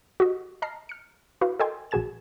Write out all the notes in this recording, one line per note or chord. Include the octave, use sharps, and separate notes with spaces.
F#4 G4 D#5
D#5 A5 A#5 F6 A#6 C7
F6 C#7
E4 F#4 B4 F5
A4 A#4 D#5 G5 G#5 C6
A#1 F#4 G#4 G#5 G#6 E7